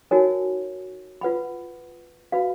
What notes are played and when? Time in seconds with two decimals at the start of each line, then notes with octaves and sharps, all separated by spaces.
0.11 D#4 F#4 A#4 C#5 G#5
1.21 F4 B4 F#5 B5
2.32 F#4 B4 F5 B5